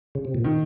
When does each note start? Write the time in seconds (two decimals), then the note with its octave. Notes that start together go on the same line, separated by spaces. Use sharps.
0.15 C#3
0.25 C3
0.35 A#2
0.44 D#3